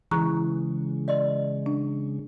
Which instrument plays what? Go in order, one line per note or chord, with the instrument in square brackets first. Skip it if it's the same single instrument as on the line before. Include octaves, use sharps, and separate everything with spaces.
[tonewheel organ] C#3 G#3 [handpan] E3 G#4 [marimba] A#5 C#6 F#6
[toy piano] D5 D#5 C6
[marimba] D4